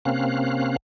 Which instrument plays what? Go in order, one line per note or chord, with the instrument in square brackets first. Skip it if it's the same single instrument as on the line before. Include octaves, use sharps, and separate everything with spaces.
[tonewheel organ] C3 A#3 C4 C#4 F5 F#6